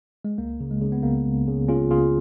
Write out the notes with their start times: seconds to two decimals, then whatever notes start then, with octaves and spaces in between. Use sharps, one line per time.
0.25 G#3
0.38 C#2 A#3
0.60 C#3
0.71 G#3
0.81 C#3
0.92 B3
1.03 C#2 A#3
1.25 C#2
1.48 C#3
1.68 C#3 C#4 F4
1.91 C#2 F4 G#4